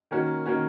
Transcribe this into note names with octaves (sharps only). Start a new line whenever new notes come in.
D#3 A#3 C#4 F#4
D#3 A#3 C#4 F#4